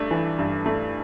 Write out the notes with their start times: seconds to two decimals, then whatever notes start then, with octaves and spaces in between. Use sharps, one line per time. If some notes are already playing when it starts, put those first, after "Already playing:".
Already playing: G2 A3 D4
0.11 E3
0.39 G2
0.66 A3